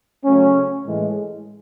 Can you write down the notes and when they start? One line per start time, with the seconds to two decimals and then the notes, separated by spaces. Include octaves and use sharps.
0.25 C#3 F#3 A3 C#4
0.86 A2 E3 G#3